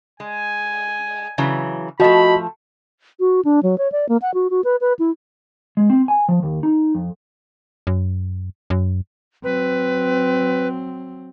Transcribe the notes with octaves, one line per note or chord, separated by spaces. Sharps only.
G#3 G#5
C#3 E3 F#3
F3 A3 F#4 D#5 B5
F#4
D4
F#3
C#5
D5
A#3
F#5
F#4
F#4
B4
B4
E4
G#3
C4
G#5
F3
D#2
D#4
F2
F#2
F#2
F#3 C4 B4